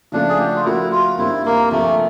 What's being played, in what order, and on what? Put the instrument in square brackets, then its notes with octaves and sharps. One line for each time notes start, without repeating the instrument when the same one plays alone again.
[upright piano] C#3 F3 A3 C#4 F4 [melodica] D4
[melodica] G#4
G4
F#4
F4
[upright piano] F3 A3 C#4 F#4 A#4 [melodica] E4
[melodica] F4
[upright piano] G2 D#3 G3 C4 F4 [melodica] E4
[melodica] A#3
[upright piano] D2 C3 F3 [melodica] A3